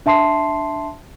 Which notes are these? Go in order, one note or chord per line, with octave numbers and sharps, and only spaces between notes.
D4 E5 A5 C6 C7